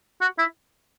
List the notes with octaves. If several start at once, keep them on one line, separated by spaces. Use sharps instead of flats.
F#4
E4